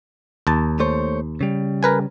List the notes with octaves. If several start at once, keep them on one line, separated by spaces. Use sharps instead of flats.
D#2 A5
A3 C5 C#5
C#3 G3
A#4 B4 G#5